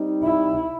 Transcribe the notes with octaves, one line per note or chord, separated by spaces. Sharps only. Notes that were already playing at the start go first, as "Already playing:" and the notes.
Already playing: G3 C4 D#4
E4